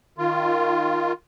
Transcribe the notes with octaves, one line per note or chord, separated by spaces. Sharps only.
D#3 F4